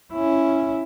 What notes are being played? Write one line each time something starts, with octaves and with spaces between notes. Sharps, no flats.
C#4 E4